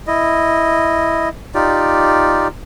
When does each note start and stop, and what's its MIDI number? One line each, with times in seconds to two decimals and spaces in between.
0.07 1.29 64
0.07 1.29 75
1.55 2.48 63
1.55 2.48 65
1.55 2.48 67
1.55 2.48 74